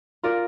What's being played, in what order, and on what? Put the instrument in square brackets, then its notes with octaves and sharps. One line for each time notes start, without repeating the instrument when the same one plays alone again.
[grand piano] F4 [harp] A#4 D5